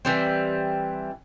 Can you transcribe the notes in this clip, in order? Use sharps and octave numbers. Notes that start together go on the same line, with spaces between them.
E3 G3 C4